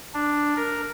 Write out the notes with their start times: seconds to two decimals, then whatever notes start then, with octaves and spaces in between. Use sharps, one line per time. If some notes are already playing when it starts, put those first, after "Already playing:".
0.14 D4
0.56 A#4